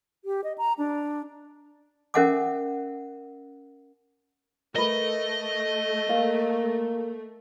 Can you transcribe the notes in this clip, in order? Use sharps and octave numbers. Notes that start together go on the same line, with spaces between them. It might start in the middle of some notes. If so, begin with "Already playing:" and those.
G4
D#5
A#5
D4
C#4 A#4 E5 F#5 G#5 D6
A3 A#4 B4 D#5
A#3 F5